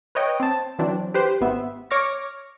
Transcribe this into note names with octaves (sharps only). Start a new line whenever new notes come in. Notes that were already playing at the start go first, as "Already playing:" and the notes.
B4 C#5 D#5 G5
C4 A5
E3 F#3 C4 D4
G4 B4 C5
G#1 B3 E5
C#5 C#6 D6 F6 A#6